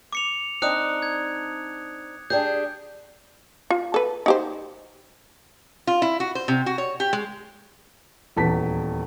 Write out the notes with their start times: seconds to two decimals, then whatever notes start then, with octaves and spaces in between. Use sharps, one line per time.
0.13 D6 C#7 F7
0.62 C4 D4 D#4 D#6 F#6 C#7
1.02 G#6
2.30 D4 G4 G#4 G6
3.70 F4
3.94 A4 B4
4.26 D#4 G4 C5
5.87 F4
6.02 E4
6.20 F#4
6.35 C5
6.48 C3
6.66 F#4
6.78 C#5
7.00 G4
7.13 G#3
8.36 D#1 E2 A5 B6